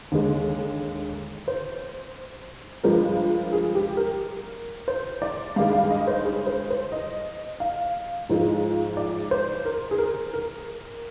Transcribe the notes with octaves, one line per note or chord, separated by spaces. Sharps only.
D#2 D3 G#3
C5
G2 F3 G#3 A#4
G#4
G4
A#4
C5
D5
G2 D#3 G#3 F5
F5
D#5
C5
G#4
C5
C5
D#5
F5
G#2 F3 G#3
D5
C5
A#4
G#4
A#4
A#4